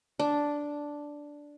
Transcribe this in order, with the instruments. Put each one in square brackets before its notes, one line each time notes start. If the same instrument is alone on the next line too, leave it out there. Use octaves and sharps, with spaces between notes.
[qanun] D4